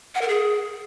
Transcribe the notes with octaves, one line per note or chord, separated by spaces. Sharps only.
F#5
A#4
G#4